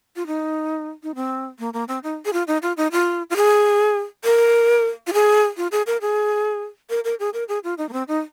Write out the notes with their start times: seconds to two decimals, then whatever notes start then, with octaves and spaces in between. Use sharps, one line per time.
0.16 F4
0.27 D#4
1.03 D#4
1.15 C4
1.59 A#3
1.74 A#3
1.88 C4
2.03 D#4
2.25 G#4
2.33 F4
2.47 D#4
2.62 F4
2.77 D#4
2.92 F4
3.30 F4
3.36 G#4
4.24 A#4
5.07 F4
5.13 G#4
5.57 F4
5.72 G#4
5.87 A#4
6.01 G#4
6.90 A#4
7.04 A#4
7.20 G#4
7.34 A#4
7.49 G#4
7.64 F4
7.78 D#4
7.89 A#3
7.93 C4
8.08 D#4